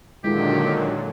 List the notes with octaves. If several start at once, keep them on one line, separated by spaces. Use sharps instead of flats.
A#2 D3 D#3 F#3 G#3 E4 F4 G4